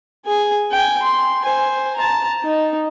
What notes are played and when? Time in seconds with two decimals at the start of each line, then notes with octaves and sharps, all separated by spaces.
0.25 G#4 G#5
0.71 G5 G#5
1.02 C6
1.44 C5 G#5
1.96 A5 A#5
2.44 D#4